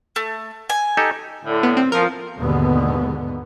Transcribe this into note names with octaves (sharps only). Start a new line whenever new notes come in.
A3
G#5
D#4 G4 A4
A2 D3
B3
C4
F3 A#4
D#2 G#2 B2 D3 B3